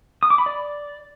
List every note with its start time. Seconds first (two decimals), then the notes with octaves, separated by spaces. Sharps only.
0.23 D#6
0.30 D6
0.38 B5
0.46 D5